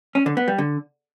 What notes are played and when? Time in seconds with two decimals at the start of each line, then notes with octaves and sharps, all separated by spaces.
0.15 C#4
0.26 D3
0.37 B3
0.48 G3
0.58 D3